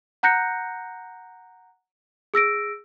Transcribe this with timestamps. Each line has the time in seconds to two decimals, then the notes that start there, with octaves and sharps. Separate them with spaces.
0.23 F#5 A#5 F#6 G6 A#6 C#7
2.34 G#4 E6 A#6 D7